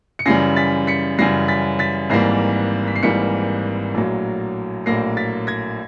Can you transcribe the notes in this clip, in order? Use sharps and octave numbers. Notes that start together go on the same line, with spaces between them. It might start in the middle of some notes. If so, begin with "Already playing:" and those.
C#7
F#2 C#3 E3 G3 A#6 C7
A6 B6
B6 C#7
F#2 C#3 E3 G3 A#6 C7
A6 B6
A6 B6
G#1 G#2 E3 G3 A#3 A#6 C7
B6
C7
G#1 G#2 E3 G3 A#3 B6 C#7
A#1 A2 F#3 A#3
A#1 A2 F#3 A#3 A#6 C7
A6 B6
G#6 A#6